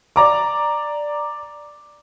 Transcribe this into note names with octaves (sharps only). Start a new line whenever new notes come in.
D5 A#5 D6